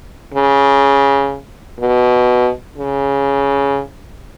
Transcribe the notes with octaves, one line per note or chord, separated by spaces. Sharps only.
C#3
B2
C#3